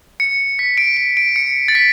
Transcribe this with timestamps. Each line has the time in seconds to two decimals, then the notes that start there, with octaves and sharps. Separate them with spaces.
0.20 C#7
0.59 B6
0.77 D7
0.97 D7
1.17 D7
1.36 C#7
1.68 A6
1.75 B6